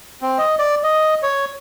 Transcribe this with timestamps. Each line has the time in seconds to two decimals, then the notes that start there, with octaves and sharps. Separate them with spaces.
0.22 C4
0.38 D#5
0.59 D5
0.83 D#5
1.23 C#5